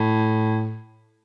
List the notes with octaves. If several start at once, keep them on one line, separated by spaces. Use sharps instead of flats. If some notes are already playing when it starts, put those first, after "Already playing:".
Already playing: A2